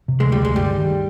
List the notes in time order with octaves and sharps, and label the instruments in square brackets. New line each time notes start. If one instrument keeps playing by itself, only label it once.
[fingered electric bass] C3
[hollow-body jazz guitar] G#3
[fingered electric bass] D2
[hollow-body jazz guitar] G3
[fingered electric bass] D2 [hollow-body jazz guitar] G#3
[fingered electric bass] G1 [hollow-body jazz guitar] G3
[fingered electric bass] D#3